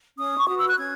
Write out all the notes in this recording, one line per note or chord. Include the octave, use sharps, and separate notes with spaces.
C#4 D#6
C#6
F#4 B4 D#6
E6
F#6
C#4 G#6